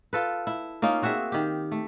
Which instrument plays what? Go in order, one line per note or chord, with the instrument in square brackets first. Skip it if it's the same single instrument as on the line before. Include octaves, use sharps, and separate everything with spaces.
[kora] F4 A4 B4
E4
A#3 C#4 D#4 F4
C4 F#4 G#4 E5
D#3 G4
A3